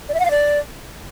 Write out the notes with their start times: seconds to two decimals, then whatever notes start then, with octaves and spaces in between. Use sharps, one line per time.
0.09 D5
0.14 E5
0.20 F#5
0.25 F5
0.31 D5